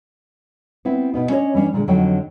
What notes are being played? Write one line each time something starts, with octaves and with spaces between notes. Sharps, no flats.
B3 C4 E4
B2 B3 D#4
C#4 D4 E4 A4 C#5 D#5
E3 G3 C#4 D4
A#2 D3 G#3
F2 D3 F#3 D#4 C#5 G5